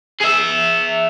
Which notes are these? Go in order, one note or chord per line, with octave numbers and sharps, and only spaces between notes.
G#4 E5